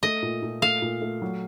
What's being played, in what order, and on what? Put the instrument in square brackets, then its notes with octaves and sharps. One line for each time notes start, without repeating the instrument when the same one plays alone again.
[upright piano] A3 [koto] D#5
[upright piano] A#2
A#2
[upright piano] A3 [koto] F5
[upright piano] A#2
A3
F#3